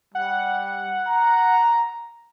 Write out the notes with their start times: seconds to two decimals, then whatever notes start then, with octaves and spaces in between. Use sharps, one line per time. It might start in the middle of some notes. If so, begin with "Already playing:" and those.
0.15 G3 F#5
1.07 A#5